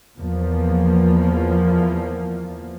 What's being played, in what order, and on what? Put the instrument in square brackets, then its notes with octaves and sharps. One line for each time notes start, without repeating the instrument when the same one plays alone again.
[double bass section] E2 F3 A#3